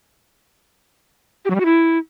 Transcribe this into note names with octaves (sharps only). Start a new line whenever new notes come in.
G4
F#3
G3
F#4
E4